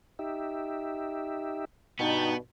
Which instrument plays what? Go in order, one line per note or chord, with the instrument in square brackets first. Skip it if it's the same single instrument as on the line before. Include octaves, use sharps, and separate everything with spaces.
[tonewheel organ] D#4 G4 E5
[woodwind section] G2 B2 [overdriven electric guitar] B3 [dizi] D#4 [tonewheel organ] G5 A5